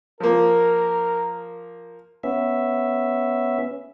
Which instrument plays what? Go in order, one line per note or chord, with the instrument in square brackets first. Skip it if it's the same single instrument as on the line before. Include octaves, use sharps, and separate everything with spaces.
[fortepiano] F3 A#3 [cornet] A#4
[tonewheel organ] B3 C#4 E5